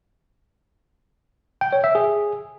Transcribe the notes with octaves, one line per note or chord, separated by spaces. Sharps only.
G5
C#5
E5
G#4